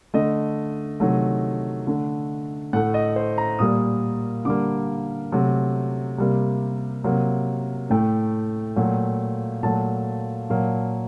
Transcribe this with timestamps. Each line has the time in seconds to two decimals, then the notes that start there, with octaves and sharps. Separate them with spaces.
0.14 D3 A3 D#5
1.00 C3 D#3 F#3 A3
1.87 D3 A3
2.73 A2 A3 F#5
2.94 D#5
3.16 C5
3.38 A#5
3.59 A#2 G3 A#3 D#6
4.45 D3 G3 A#3 D6
5.32 C3 F#3 A3
6.18 C3 G3 A#3
7.04 C3 F#3 A#3
7.90 A2 A3 G5
8.76 A#2 F#3 A3
9.63 A#2 F#3 A3 A5
10.50 A#2 F#3 A#3